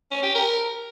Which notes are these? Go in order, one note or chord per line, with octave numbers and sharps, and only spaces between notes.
C#4
G4
A#4